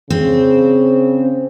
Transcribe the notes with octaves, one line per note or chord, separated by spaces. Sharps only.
C#3 C4